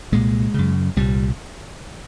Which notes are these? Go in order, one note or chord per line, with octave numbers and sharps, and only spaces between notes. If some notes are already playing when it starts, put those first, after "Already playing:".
C2 A#2 G#3
F#2 C#3
C2 A#2 G3